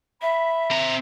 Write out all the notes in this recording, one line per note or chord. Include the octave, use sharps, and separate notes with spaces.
E5 B5
C4 A#5